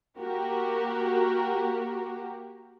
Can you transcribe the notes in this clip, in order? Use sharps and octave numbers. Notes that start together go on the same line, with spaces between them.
A#3 F#4 G4 A#4